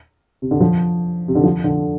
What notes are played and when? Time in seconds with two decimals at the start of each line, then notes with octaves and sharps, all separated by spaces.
0.42 C3
0.51 D3
0.60 F3
1.28 C3
1.35 D3
1.44 F3
1.64 D3